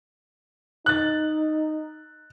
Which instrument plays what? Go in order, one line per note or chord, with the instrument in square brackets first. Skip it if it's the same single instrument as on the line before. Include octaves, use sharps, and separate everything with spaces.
[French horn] D#4 [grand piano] F#6 A6